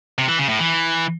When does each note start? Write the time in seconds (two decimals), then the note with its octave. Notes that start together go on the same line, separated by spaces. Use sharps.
0.18 C3
0.29 E3
0.39 C#3
0.49 A2
0.59 E3